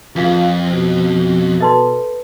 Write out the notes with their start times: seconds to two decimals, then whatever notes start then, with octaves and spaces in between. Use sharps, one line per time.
0.16 F2 F4 G#4 B4 F5
0.70 B2 C5
1.61 A4 B4 D#5 A5 C6